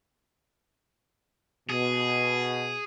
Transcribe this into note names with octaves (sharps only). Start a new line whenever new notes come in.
B2 G#4